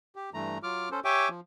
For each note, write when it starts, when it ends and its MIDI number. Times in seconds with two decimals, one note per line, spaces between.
0.16 0.30 67
0.34 0.58 43
0.34 0.58 52
0.34 0.58 57
0.34 0.58 82
0.63 0.89 54
0.63 0.89 65
0.63 0.89 86
0.63 0.89 89
0.91 1.00 61
0.91 1.00 69
0.91 1.00 72
1.05 1.29 67
1.05 1.29 73
1.05 1.29 76
1.05 1.29 79
1.05 1.29 80
1.05 1.29 86
1.29 1.40 53